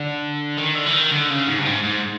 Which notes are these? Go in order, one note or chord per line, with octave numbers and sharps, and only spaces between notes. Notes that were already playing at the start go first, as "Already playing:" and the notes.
Already playing: D3
D#3
D3
E3
D#3
D3
C#3
G#2
G2
G#2
G#2